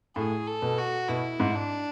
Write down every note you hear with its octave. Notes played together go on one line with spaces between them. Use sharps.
A2 G#4
A4
B2
F#4
B2 E4
G#2
D4